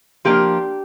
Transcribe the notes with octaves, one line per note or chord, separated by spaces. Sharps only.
F3 A#3 D4 G4